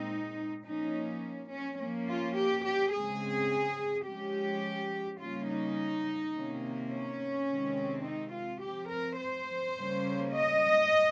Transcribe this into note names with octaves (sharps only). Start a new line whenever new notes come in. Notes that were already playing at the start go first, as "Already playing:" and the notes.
Already playing: A#2 G#3 C4 D#4
F3 A#3 C#4 D#4
C#4
F3 A#3 C#4
F4
G4
G4
C#3 G#3 C4 G#4
F3 G#3 C#4 G4
C#3 G3 A#3 C#4 F4
D#4
C3 D#3 A#3 C#4
C#4
C3 D#3 G#3 C4
D#4
F4
F3 C4 G4
A#4
C5
C#3 G3 A#3 C#4
D#5